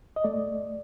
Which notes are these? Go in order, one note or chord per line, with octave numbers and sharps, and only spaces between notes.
D#5
A3 D5